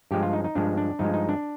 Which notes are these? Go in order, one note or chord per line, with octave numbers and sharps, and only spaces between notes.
G2 F3 G#3 G4
F4
D#4
D#4
G2 F3 G#3 D4
D4
G2 F3 G#3 D#4
D#4
D4